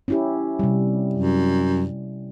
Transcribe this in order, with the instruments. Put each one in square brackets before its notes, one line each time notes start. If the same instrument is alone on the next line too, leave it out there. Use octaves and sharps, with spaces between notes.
[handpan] C#4 E4 G4
C3 G3
[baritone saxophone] F#2